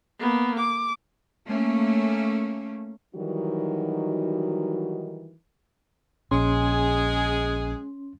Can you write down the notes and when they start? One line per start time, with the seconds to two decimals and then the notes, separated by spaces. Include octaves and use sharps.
0.20 A#3 B3
0.59 D6
1.47 A3 A#3 C#4
3.16 D#3 E3 F#3 G3 D#4 F#4
6.31 A#1 G#3 C#4 G#4 C6